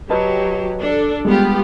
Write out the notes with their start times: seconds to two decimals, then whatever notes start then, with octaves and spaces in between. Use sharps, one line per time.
0.10 F#3 G4 B4 D#5 A5
0.79 D4 A4
1.25 G3 G#3 B3 F4 G4